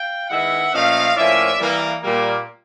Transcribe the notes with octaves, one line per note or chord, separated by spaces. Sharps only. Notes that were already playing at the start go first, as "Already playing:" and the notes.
Already playing: F5 G5
D#3 G#3 B3 E4 E5 F#5
A#2 F3 A3 C#4 D#5 F5
A2 F3 A#3 C#4 E4 D5 E5
E3 G3 A#3
A#2 G3 A#3